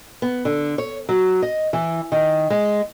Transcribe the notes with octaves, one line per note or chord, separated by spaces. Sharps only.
B3
D3
C#5
F#3
D#5
E3
D#3
G#3